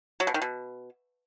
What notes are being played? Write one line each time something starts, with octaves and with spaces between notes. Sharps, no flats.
F#3
B2
D#3
B2